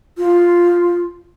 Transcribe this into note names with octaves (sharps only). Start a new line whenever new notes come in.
F4